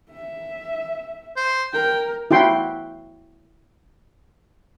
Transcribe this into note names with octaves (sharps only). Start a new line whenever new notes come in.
E5
C5
A#4 G5
E4 F#4 G5 C6